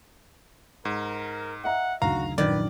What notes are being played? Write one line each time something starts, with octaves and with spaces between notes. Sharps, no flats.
G#2 A#4
D#5 E5 F#5 A#5
F#1 D2 D#3 F#4 F5 A#5
A#1 F#2 D#3 B4 D5